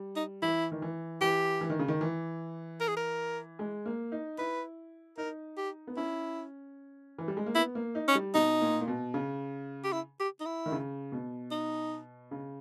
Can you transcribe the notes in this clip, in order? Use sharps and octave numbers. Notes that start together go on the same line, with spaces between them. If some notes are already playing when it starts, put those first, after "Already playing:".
Already playing: G3
D#4
E3 E4
D#3
E3
E3 G4
E3
D#3
C#3
D#3
E3
A#4
G#4
A#4
G#3
A#3
D#4
E4 B4
D#4 A#4
G4
B3
C#4 E4
E3
G3
G#3
A#3
B3 E4
A#3
D#4
C#4
G3
B2 D#4
A#2
A#2
B2
C#3
G4
E4
G4
D#4
E4
D#3
C#3
B2
D#4
C#3